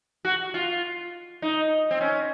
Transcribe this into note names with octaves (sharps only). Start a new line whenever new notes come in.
F#4
F4
D#4
C4
C#4